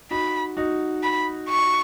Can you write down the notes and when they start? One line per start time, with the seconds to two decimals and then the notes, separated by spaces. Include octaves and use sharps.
0.11 D#4 F#4 B5
0.57 D#4 F#4
1.03 B5
1.49 C#6